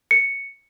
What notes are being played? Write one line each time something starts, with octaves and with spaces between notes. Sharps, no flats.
C#7